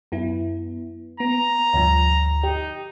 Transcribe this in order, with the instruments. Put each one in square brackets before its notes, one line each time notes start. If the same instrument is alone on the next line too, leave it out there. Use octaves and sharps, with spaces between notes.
[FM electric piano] F#2 B3 E4
[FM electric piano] B3 [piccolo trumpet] A#5
[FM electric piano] D2 G2 F3
[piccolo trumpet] D#4 [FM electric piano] G4